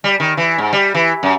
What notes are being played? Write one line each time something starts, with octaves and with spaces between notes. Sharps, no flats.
G3
D#3
E3
G#2
G3
E3
F#2